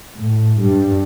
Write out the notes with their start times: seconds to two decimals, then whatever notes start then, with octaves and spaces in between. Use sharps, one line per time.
0.18 A2
0.62 G2